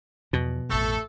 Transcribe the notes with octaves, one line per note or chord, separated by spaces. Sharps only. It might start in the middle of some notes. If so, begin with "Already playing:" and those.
E2 B2 F3
A1 F2 A3 A4